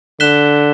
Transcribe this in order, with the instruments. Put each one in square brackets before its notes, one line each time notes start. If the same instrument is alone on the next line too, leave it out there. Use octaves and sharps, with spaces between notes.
[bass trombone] D3 [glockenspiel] F#6 B6 E7 G7